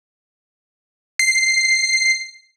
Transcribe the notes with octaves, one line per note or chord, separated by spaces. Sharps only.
C7